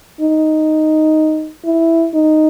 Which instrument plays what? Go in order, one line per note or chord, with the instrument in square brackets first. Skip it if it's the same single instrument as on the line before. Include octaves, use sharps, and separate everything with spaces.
[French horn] D#4
E4
D#4